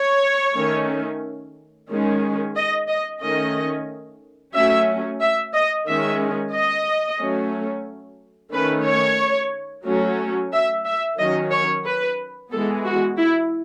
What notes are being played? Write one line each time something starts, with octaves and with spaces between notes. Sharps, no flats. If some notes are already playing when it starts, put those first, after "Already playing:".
Already playing: C#5
D#3 A3 C#4
D#3 G#3 C#4
D#5
D#5
D#3 A3 C#4 D#5
F#3 A3 C#4 E5
E5
D#5
D#3 G#3 C#4 E5
D#5
F#3 A3 C#4
D#3 A3 C#4 B4
C#5
F#3 A3 C#4
E5
E5
D#3 F#3 C#4 D#5
C#5
B4
E3 G#3 B3 A4
F#4
E4